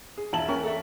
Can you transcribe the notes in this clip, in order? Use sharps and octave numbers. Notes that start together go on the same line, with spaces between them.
G#4
E1 E4 F4 E5 A5 F#7
C#4 A#4 B4 G5
A4 D5 E5